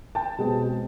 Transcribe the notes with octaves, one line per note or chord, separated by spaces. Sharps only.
G5 A5
B2 G#3 C4